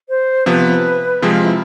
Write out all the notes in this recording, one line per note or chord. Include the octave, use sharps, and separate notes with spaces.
C5
C3 F3 B3 B4
C3 F3 G#3 G#4
F4
E4